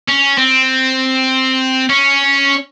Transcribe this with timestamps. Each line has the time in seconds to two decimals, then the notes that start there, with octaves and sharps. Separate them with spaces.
0.08 C#4
0.38 C4
1.90 C#4